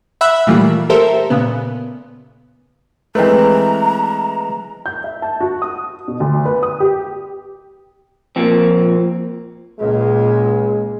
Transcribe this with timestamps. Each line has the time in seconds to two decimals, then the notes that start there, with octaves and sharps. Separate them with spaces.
0.21 E5 F#5 B5 E6 F#6
0.47 A#2 E3 G3 A3 A#3 F4
0.89 G4 A4 A#4 C5 E5
1.30 A#2 C#3 B3
3.15 E3 G#3 A3 C4 B4 A#5
4.86 G6
5.04 E5
5.22 A5
5.40 F#4
5.62 D#6
6.08 B2
6.20 D2
6.45 B4
6.63 D#6
6.80 G4
8.36 A#2 F3 C4
9.79 C#2 A#2 G#3